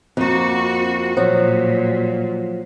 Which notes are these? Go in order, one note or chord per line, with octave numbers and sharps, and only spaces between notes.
F2 A#3 C4 F#4
A#2 F3 F#3